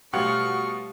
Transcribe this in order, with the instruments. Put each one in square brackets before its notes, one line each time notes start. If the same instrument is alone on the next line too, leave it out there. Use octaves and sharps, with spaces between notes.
[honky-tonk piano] B2 F#5 [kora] G3 F4 C#5 [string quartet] A3 C#6 F6